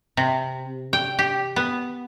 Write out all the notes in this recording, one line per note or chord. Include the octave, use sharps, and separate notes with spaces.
C3
G5
G4
B3